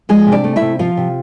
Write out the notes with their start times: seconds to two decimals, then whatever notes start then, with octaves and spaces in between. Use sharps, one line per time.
0.09 F3 G#3 G#4
0.27 C3
0.32 D4 D5
0.44 A3
0.56 E4 E5
0.62 C3
0.79 F3 F4 F5
0.97 C3